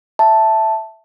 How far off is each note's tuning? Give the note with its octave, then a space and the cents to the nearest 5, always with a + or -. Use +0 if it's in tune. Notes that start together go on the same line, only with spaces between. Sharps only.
E5 +0 A5 +0